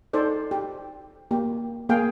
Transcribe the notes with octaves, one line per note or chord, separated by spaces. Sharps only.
D#4 A4 C5 D5
G4
A#3 G4
A#3 G#4 F5 G5